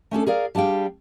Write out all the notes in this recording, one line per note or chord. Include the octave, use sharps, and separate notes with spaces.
A3 C#4 D4 A4
G#4 A#4 D5 F5
G3 D4 G#4 F5 G5